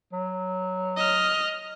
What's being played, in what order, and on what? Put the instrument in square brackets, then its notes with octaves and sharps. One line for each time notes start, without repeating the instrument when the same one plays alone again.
[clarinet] F#3
[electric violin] D#5 F6